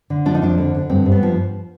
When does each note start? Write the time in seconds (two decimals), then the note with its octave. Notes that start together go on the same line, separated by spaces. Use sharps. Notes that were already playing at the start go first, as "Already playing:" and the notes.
0.10 D3
0.25 F3 D4
0.35 D#4
0.42 F2 D4
0.58 D3
0.75 D3
0.90 G2 C4
1.06 G2
1.12 B3
1.23 F3